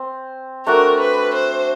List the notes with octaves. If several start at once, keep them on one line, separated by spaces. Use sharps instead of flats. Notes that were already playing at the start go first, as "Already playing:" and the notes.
Already playing: C4
A3 D4 F#4 A#4
B4
C5